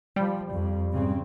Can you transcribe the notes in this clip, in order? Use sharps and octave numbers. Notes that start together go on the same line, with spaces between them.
F3 G3
F2
G#2 C#3 C4